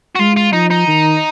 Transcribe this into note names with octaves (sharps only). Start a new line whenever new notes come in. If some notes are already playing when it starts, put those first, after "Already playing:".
F#4
G#3 F4
F4
F3 D#4
D#4
D#3